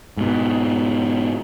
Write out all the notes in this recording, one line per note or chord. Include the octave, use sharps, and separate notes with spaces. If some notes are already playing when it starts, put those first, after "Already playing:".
G#2 B2